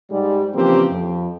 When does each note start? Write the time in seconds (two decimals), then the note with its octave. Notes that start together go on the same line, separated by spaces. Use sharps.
0.11 G#2 G3 G#3
0.55 C#3 E3 F3 A#3 C4 G4
0.91 F2